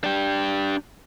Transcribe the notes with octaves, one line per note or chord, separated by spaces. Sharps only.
D4 G4